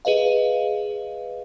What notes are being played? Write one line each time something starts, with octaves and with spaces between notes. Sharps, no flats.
G#4 B4 D#5 F5